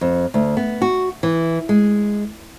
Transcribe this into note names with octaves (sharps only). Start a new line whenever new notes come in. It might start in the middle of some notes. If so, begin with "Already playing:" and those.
F2
D2
B3
F#4
E3
G#3